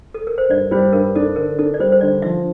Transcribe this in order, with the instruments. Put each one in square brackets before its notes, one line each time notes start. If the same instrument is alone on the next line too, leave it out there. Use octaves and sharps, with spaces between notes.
[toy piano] A4
A#4
C5
[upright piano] G2 [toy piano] D5
[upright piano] G3 [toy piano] C5
[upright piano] G2 [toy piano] A#4
[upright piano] D4 [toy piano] A4
[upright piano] D3 [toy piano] A#4
[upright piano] D4 [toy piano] A4
[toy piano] D5
[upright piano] G3 [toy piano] C5
[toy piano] C5
[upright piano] D3 [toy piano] D5
[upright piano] F3 [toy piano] E5